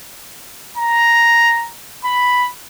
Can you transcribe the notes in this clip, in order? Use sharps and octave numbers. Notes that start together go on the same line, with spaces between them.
A#5
B5